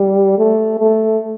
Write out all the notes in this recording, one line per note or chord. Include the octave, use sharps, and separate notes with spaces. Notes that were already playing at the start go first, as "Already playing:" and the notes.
Already playing: G3
A3
A3